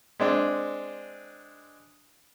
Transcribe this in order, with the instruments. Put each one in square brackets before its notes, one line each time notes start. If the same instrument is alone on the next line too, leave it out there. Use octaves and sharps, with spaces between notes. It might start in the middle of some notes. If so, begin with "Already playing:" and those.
[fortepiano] G#3 C4 D4